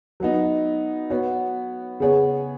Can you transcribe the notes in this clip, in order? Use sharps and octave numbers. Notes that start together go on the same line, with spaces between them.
F#3 B3 D#4
B3 F#4 C#5
C#3 B3 G#4 C#5